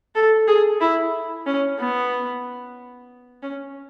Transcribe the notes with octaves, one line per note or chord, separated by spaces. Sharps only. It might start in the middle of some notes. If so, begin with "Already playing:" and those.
A4
G#4
E4
C#4
B3
C#4